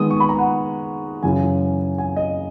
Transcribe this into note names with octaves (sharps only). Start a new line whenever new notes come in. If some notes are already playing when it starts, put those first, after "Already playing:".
Already playing: D#3 G#3 B3 D#6
C#6
B5
A#5
F#5
F#2 C#3 E3 G#5
G#5
D#5